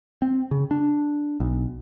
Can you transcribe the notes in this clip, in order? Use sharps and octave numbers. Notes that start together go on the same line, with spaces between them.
C4
C#3
D4
B1